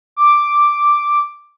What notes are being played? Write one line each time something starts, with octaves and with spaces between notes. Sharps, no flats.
D6